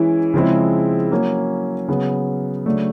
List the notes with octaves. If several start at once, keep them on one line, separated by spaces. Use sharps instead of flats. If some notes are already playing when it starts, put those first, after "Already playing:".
Already playing: E3 G#3 C#4 E4
C#3 F3 G#3 C4 E4
F#3 A#3 C#4
C#3 F#3 B3
C#3 F#3 A3 D4